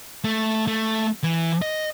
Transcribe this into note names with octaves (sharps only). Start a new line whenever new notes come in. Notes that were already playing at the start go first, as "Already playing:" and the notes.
A3
A3
E3
D#5